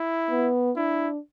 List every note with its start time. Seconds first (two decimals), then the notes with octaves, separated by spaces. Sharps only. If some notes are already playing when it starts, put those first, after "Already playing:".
Already playing: E4
0.30 B3
0.76 D4 E4